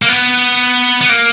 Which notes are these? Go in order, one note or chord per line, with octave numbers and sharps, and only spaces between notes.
A#3
B3
B3
A#3